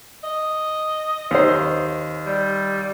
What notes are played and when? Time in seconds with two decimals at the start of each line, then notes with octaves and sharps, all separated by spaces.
0.24 D#5
1.31 D#2 C5
2.26 G3